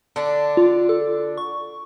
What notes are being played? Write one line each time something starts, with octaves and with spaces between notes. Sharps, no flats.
D3 D4
F4
A4
C#6